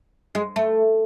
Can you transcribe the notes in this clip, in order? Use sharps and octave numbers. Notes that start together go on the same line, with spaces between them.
G#3
A3